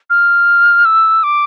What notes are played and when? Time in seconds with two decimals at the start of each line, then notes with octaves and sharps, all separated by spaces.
0.10 F6
0.85 E6
1.23 D6